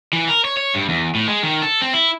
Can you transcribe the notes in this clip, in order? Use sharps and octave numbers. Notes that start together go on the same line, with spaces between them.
E3
A#4
C#5
C#5
G2
E2
A2
G#3
D#3
A4
C4
E4